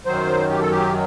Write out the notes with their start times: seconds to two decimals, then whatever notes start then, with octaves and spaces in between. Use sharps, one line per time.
0.06 F#2 D#3 F#3 C5
0.50 G4
0.60 A4
0.71 G4